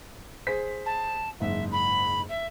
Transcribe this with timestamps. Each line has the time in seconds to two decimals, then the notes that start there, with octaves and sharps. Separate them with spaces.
0.47 G#4 C5 B6
0.85 A5
1.40 F#1 G#2 E5
1.71 B5
2.29 E5